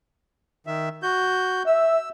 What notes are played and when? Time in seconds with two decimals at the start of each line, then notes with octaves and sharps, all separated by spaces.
0.67 D#3 E5
1.03 F#4 G6
1.67 E5 E6